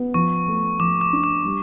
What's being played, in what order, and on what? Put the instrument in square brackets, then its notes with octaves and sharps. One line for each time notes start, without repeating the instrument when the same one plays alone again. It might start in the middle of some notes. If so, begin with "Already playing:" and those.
Already playing: [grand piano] B3
[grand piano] F3 [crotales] C#6
[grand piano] A3
[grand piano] F3 [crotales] D6
[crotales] D6
[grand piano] D4
[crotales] D6
[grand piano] G3